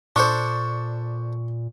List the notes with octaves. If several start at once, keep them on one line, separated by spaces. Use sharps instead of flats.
A#2 D4 A4 C5 C#6